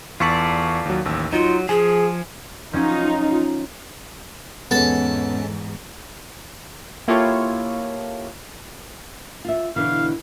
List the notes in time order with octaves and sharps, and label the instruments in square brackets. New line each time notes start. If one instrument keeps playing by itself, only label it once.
[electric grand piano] E2 C#6 B6 [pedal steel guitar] F4 A4 D5
[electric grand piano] D#2 F#3
A1 D#2 E6
[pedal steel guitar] F#3 [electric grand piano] D#4 [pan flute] F4
[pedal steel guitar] F3 [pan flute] G#4 [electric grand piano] G#5
[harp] F3 F#3 C#4 [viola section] D#4 F4
[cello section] E2 G#2 [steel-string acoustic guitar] G#3 C#4 [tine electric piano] B3 [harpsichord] A4 A5
[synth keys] A#3 E4 F4 G4 A4 C#5
[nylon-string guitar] F4 E5
[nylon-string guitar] B2 D3 E3 [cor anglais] F5